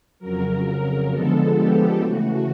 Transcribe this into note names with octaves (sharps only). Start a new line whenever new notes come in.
F2 C#3 F#3 A#4
D3 F3 G#3 B3 A4
G4
C#3 E3 A3 F#4